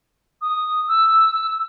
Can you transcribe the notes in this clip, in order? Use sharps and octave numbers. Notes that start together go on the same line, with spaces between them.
D#6
E6